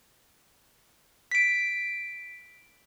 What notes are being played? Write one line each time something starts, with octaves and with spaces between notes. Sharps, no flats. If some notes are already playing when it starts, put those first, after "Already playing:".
B6 D7